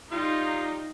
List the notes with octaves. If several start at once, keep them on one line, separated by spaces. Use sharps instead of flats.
G3 D#4 F4